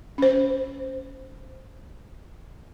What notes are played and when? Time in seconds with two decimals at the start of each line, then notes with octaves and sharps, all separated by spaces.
0.18 C#4 C5